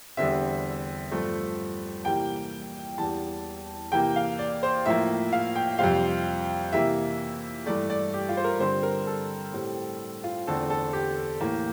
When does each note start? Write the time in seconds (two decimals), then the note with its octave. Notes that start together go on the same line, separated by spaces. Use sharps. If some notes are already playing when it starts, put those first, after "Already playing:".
0.17 E2 D3 G3 C4 E5
1.12 G2 F3 A3 C4
2.05 C3 E3 G3 A#3 G5
2.98 E2 E3 G3 A5
3.92 C3 E3 A#3 G5
4.16 F5
4.39 D5
4.63 C5
4.86 A2 F3 A#3 E5
5.33 F5
5.56 G5
5.79 F2 C3 G3 C4 F5
6.73 C3 E3 A#3 E5
7.66 G2 E3 A3 D5
7.90 D5
8.13 G4
8.29 F4
8.37 C5
8.44 A#4
8.60 G2 D3 G3 C4 C5
8.83 A#4
9.07 A4
9.53 A2 G3 C4
10.24 F4
10.47 E2 D3 A3 C4 A4
10.70 A4
10.93 G4
11.41 A2 E3 A#3